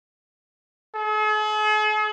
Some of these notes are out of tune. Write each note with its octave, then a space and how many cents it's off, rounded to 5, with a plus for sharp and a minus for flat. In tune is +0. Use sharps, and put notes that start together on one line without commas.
G#4 +45